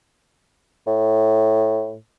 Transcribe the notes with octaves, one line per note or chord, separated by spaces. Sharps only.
A2